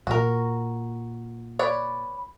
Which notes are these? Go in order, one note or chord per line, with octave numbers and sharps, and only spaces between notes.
A#2 F#4 A#4
B4 C#5 D5